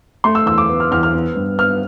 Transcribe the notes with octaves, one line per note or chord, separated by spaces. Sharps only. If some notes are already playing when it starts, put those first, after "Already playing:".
A3 C6
E6
E2 E6
D6
B3
F6
E2 F6
F6
B3
G2
B3 F6